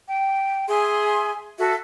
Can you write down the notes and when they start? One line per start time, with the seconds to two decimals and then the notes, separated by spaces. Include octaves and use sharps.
0.07 G5
0.69 G#4 E5 G#5 C6
1.60 F#4 A4 E5